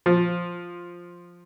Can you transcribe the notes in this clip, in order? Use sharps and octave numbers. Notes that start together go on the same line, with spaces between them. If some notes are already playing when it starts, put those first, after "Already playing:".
F3